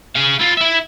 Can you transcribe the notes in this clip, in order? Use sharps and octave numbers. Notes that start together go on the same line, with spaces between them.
G#4 F5
E4 F4
E4 E5